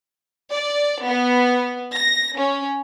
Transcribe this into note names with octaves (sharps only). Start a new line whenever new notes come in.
D5
B3
A#6
C#4